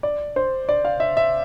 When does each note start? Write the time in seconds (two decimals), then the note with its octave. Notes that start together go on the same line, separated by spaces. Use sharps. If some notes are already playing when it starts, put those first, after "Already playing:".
0.03 D5
0.36 C5
0.69 D5
0.85 F5
1.00 E5
1.17 E5